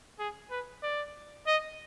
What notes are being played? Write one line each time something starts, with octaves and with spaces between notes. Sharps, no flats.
G#4
B4
D5
D#5